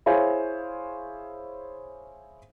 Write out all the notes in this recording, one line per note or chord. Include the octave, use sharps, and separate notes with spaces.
E4 G#4 C5 C#5 F5 G#5